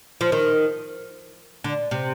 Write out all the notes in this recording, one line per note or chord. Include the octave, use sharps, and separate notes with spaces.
F3
D#3
D3
C3